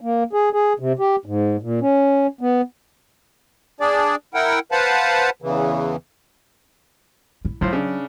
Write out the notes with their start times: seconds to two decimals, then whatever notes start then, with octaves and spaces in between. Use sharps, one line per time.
0.01 A#3
0.33 G#4
0.53 G#4
0.79 C3
0.99 G4
1.26 G#2
1.62 A#2
1.81 C#4
2.41 B3
3.80 D4 G#4 D5
4.34 E4 A#4 F#5 G5
4.72 B4 C5 F5 F#5 A5 B5
5.42 E2 C#3 E3
7.45 E4
7.61 A2 F#3 F4 C5
7.73 C#3 D4